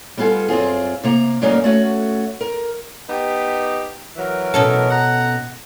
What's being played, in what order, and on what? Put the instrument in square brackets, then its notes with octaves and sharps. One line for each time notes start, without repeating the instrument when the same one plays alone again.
[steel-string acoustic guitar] G3 B3 F4 G#4 A4
F#2 C4 F4 G#4
C3 A#3 A#5
D2 G2 F#3 A#3 C#4 D#4
A3 C#4 F#4
A#4
[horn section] B3 D#4 G4
E3 F#3 A#4
[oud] B2 C#4 A4
[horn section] F#5 A#5